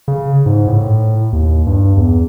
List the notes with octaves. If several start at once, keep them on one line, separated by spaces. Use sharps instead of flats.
C#3
G#2
A2
D#2
G2
E2